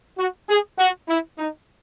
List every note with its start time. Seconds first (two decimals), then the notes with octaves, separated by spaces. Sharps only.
0.18 F#4
0.49 G#4
0.79 F#4
1.09 E4
1.38 D#4